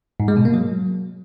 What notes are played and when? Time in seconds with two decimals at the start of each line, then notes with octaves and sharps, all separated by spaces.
0.20 G#2
0.28 G#3
0.37 B2
0.45 A#3
0.54 F#3